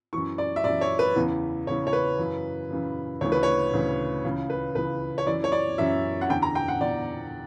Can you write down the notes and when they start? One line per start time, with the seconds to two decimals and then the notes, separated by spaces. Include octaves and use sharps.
0.13 F#2 E3 C#6
0.38 D5
0.56 E5
0.64 F#2 E3 D5
0.81 C#5
0.99 B4
1.16 E2 C#3 E3
1.67 E2 C#3 E3 C#5
1.87 C#5
1.93 B4
2.19 F#2 C#3 E3
2.70 F#2 C#3 E3
3.21 D2 C#3 E3 C#5
3.32 B4
3.43 C#5
3.73 D2 C#3 E3
4.24 C#2 C#3 E3
4.50 B4
4.75 C#2 C#3 E3 B4
5.18 C#5
5.27 F#2 E3 D5
5.44 C#5
5.52 D5
5.78 F#2 E3 E5
6.21 F#5
6.29 E2 D3 G5
6.42 A#5
6.55 G5
6.68 F#5
6.81 E2 D3 D5